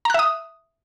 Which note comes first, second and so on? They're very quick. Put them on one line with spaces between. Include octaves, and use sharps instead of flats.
A#5 F#6 E5 D#6